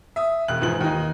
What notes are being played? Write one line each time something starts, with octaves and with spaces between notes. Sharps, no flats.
E5 D#6
E1 F#6 F#7
E2 G#2 E3 F3 F#7
D#2 D#4